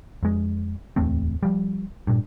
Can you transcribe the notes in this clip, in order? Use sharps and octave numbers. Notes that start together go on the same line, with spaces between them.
F2 G#3
D1 E2 A3 C4
F3 G3
G2 A#2